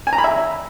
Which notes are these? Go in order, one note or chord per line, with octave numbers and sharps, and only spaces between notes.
G#5
A#5
B5
E5